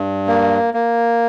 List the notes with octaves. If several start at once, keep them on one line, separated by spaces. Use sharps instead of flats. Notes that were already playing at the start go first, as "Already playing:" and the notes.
Already playing: G2
A#3
A#3